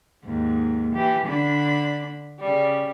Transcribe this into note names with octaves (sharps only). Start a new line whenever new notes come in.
D#2 G#2
E3 G4
D3 D4 B5
C#3 G3